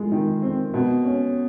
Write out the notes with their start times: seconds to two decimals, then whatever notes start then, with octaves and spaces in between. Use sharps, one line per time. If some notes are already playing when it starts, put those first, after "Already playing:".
Already playing: G#3 F4
0.12 D#3
0.42 C4
0.74 B2
1.04 C#4